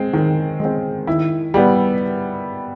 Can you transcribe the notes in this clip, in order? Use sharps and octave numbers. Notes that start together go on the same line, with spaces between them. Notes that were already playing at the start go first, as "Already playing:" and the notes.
Already playing: G#3 C4
D#3
G#3 C4
D#3 E4
G3 B3